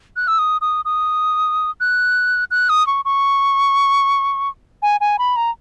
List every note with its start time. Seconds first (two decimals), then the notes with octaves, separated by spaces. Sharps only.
0.16 F#6
0.28 E6
0.38 D#6
0.61 D#6
0.85 D#6
1.80 F#6
2.51 F#6
2.69 D#6
2.87 C#6
3.05 C#6
4.82 G#5
5.01 G#5
5.19 B5
5.36 A#5